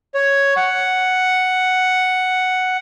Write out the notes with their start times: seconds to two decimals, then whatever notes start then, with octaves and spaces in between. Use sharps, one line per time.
0.14 C#5
0.56 F#5